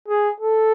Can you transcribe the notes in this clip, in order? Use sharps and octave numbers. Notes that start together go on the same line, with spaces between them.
G#4
A4